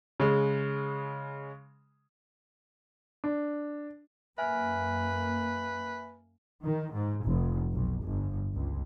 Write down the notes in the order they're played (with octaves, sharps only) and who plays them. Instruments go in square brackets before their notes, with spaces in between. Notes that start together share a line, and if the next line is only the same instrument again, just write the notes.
[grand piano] C#3 G#3
D4
[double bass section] F#2 A#3 [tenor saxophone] B4 [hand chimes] E5 G#5 F6
[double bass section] D#3
G#2
F1
B1
G1
C#2